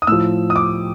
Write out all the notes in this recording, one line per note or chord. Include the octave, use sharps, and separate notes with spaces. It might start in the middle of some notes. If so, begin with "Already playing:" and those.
D#6
A2 F3 E6
D#6
D6